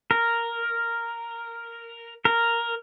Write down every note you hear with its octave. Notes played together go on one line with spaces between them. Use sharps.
A#4
A#4